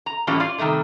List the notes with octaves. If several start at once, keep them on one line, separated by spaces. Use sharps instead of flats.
A#5
A2 E3 G3 A#3 C#4 F4
F4 D5 F5
C3 D#3 G3 A3 D4